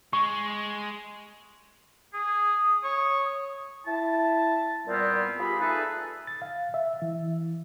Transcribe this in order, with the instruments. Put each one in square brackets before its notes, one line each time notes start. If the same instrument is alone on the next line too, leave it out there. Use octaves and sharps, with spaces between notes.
[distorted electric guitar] G#3 [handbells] C#6
[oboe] G#4 [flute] D#6
[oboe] C#5
[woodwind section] E4 A5
A#2 G3 B3 C4
F4 G4 G#4 B5
A3 D#4 G#4 A4 B4
[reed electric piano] A6
F5
E5
E3